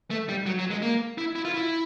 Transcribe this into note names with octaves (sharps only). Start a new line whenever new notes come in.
A3
G3
F#3
F#3
G#3
A#3
E4
E4
F4
E4